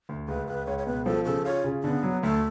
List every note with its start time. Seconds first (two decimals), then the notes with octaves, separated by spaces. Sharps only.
0.09 D2
0.28 C#2 B4
0.48 C#2 B4
0.67 C#2 C#5
0.78 C#5
0.87 B2 B4
1.05 F3 A4
1.25 C#3 A4
1.45 F4 C#5
1.64 C#3
1.83 D3 B3
2.03 F#3
2.23 D2 A3